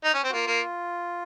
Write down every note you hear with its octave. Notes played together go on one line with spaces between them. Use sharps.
D#4
C#4
C4
F#4
A#3 F4
A#3